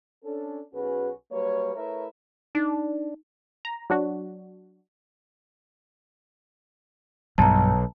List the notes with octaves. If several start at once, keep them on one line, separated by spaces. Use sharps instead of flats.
C#4 D4 A4
B1 C#4 F#4 G#4 B4
F#3 G3 A#3 B4 C#5
A3 E4 A#4 B4 C#5 E5
D4 D#4
A#5
F#3 D4 F#4
B1 G2 A5 A#5